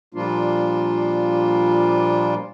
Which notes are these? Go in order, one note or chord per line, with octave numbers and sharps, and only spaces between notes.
A#2 F3 G3 A#3 D4 F4